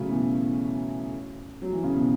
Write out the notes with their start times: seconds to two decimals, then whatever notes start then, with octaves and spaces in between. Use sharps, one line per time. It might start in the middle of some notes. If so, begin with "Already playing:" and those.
Already playing: C#3 F#3 A3 C#4
0.09 B2 E3
1.62 F#3
1.73 E3
1.84 C#3
1.95 B2